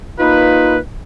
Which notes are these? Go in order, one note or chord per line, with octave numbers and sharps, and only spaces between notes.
A#3 D#4 F4 B4